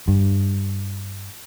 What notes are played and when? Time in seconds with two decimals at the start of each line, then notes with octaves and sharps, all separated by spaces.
0.08 G2